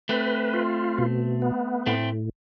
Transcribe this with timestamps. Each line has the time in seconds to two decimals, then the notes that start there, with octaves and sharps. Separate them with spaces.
0.09 A3 C4 B4
0.54 F4
0.98 B2
1.42 B3
1.86 A2 A3 C4